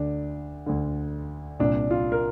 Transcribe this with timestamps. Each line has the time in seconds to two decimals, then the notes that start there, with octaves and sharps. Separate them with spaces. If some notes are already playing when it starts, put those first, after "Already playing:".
Already playing: D2 D3 D4
0.66 D2 D3
1.60 C2 A#2 D4
1.91 F4
2.12 A#4